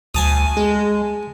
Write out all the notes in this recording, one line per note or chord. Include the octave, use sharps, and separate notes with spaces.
D2 G#5 A5 D#6
G#3 G#4